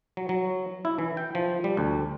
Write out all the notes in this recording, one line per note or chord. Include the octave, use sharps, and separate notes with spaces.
F#3
F#3
E4
E3
G5
F3
G3
D2